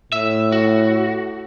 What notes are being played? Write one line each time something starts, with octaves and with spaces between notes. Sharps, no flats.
A2 E5
F#4